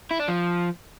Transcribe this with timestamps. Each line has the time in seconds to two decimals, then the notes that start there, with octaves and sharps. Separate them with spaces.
0.11 E4
0.20 D4
0.28 F3